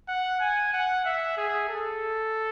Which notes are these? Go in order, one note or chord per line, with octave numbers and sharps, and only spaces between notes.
F#5
G#5
F#5
E5
G#4
A4